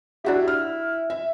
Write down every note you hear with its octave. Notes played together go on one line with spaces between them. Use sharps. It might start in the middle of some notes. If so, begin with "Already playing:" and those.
D4 E4 F#4 G4
F6
E5